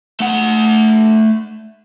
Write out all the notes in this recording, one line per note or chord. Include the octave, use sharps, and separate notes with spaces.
A3 F#5